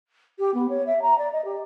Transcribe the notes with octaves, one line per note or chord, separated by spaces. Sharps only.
G4
B3
C#5
E5
A#5
D5
D#5
G4